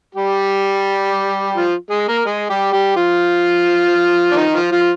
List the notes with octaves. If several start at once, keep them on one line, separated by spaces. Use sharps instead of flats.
G3 G4
F3 F4
G#3 G#4
A#3 A#4
G#3 G#4
G3 G4
G3 G4
F3 F4
D4
D#3 D#4
F3 F4
F3 F4